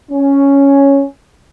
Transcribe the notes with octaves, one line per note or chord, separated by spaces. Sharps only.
C#4